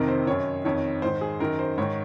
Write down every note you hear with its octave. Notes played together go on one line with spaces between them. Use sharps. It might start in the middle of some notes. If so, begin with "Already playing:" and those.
Already playing: F2 C3 D#3 A#4
C5
F#2 D#3 C#5
F2 D#3 C#5
G#2 D#3 C5
G#4
F#2 D#3 A#4
C5
G#2 D#3 C#5